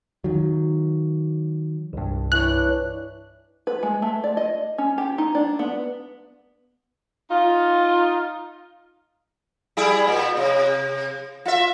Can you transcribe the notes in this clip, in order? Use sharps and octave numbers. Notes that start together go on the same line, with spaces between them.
D#3 F#3
C2 G2
E3 D4 C#5 F#6
B4
G#3
A3
D5
D#5
C#4
G4
D#4
D4
B3
D#4 F4
G3 E4 G#4
A#2
C3
F4 E5